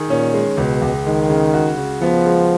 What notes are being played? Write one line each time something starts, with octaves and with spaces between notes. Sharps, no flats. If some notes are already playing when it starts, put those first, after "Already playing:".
Already playing: D#3 G#4
A#2 C#4
G#3
C#2 B2
C#2
D#3 G#3
C#3
F#4
C#3
F3 B3
G#3